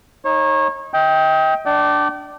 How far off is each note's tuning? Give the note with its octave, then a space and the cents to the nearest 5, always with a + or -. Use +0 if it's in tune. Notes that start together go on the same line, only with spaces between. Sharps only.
D#4 +10 C#5 -30
D#5 +35 G5 +0
D4 +0 D5 +0 G5 -40